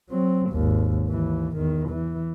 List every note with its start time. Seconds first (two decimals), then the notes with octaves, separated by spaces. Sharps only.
0.10 F#3 C4
0.50 G#1 D#2
1.07 D#2 E3
1.56 E2 D#3
1.89 E3